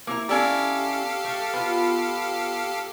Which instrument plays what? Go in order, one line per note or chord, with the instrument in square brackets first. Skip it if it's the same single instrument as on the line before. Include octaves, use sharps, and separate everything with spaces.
[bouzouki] A#3 E4 A#5
[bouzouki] C#4 E4 D5 [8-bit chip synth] G4 A4 F5
[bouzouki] A3
B3 F4